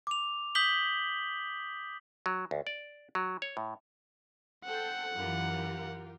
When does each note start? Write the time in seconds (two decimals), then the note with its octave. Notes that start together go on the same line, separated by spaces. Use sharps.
0.07 D6 F7
0.55 D#6 G6 B6 F#7 G7
2.26 F#3
2.51 D2
2.67 D5
3.15 F#3
3.42 C#5
3.57 A2
4.65 A4 C5 F#5 G5
5.15 F#2 E3 F4 G4 A#4